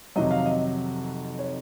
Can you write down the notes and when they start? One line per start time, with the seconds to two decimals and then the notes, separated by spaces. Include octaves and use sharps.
0.16 F2 C3 D#3 F#3 D#5
0.31 F5
0.46 D#5
1.39 C#5